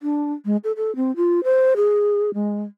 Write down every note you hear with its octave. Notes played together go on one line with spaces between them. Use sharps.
D4
G#3
A4
A4
C4
F4
C5
G#4
G#3